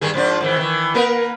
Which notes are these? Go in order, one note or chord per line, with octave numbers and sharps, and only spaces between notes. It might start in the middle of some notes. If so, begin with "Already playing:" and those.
G2 D#3 G#4
G#2 F3 D4
G#2 D#3 E3
D#3 E3
A#3 A#4 B4